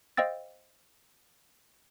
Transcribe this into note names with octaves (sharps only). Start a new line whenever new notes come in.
C5 D#5 F5 G5 E6 A6